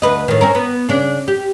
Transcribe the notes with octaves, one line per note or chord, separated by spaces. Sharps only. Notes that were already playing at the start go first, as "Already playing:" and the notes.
D2 B4 D#5
A2 D#3
C4 C#4 A#4
B3
C#3 D4
G4